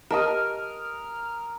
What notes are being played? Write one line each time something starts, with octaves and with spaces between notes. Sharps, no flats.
G4 A#4 D#5 A5 D#6 F6